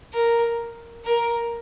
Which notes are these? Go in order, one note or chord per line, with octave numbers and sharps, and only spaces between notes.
A#4
A#4